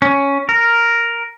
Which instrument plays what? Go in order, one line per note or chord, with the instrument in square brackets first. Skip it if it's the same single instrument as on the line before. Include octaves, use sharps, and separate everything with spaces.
[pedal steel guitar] C#4
A#4